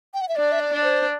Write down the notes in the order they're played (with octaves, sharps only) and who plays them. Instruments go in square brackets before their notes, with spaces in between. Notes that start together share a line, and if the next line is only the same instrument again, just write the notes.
[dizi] G5
F#5
E5
[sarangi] D4 [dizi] D5
[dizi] E5
D5
[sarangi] D4
[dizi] C5